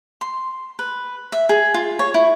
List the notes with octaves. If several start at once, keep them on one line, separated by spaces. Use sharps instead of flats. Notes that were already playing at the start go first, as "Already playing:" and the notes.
C6
B4
E5
G#4
F4
C#5
E4